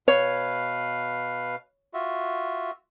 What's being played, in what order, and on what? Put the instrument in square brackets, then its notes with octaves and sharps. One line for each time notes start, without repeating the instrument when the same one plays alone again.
[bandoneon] B2 B4 F5 [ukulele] C#5
[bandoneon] F4 F#4 E5